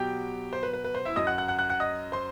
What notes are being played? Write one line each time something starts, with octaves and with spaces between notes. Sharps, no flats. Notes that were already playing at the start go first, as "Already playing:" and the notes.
Already playing: B2 F#3 G4 G5
C5
B4
B4
B4
C5
E4 E5
F#2 F#3 D#5 D#6
F#5 F#6
F#5 F#6
F#5 F#6
F#5 F#6
F#5 F#6
D#5 D#6
C5 C6